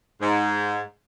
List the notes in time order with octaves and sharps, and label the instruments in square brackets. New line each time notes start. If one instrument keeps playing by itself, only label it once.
[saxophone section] G#2